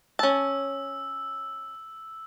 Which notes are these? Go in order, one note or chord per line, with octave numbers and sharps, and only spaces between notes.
C#4 A5 E6